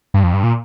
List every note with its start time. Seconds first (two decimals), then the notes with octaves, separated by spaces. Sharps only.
0.14 G2
0.24 F2
0.34 G2
0.43 A#2